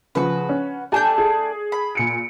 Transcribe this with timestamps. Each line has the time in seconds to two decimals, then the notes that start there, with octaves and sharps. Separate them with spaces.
0.15 C#3 F3 F#4 B4
0.49 C#4
0.92 A3 D4 G4 G#5 A5 G6
1.18 G#4
1.72 B5
1.95 A#2 C#7 D7